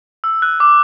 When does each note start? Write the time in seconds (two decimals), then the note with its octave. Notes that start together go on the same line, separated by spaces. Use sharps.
0.24 E6
0.42 F#6
0.60 D6